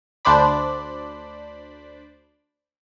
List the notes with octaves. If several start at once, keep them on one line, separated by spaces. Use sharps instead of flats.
D2 D4 C5 D5 B5